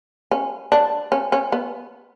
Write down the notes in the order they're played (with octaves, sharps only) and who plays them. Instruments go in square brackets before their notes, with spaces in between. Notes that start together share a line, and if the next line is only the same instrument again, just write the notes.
[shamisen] C#4
D4
C#4
C#4
B3